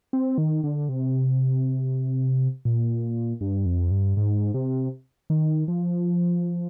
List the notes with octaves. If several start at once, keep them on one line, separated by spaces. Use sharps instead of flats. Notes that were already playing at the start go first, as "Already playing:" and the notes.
C4
D#3
D3
C3
A#2
G2
F2
G2
G#2
C3
D#3
F3